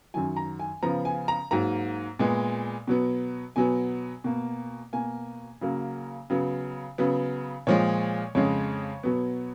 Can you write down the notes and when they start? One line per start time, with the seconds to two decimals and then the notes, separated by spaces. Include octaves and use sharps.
0.14 F#2 D#3 F#3 G#5
0.37 A#5
0.59 G#5
0.83 C#3 F3 B3 A#5
1.05 G#5
1.28 A#5
1.51 G#2 F#3 A#3 A#5
2.19 A#2 G#3 B3
2.87 B2 F#3 B3
3.56 B2 F#3 B3 G#5
4.24 B2 A#3
4.93 B2 A#3 G#5
5.61 C#3 F#3 A#3
6.30 C#3 F#3 B3
6.98 C#3 F#3 B3
7.67 A#2 F3 G#3 C#5
8.35 F2 C#3 G#3 C#5
9.03 B2 F#3 B3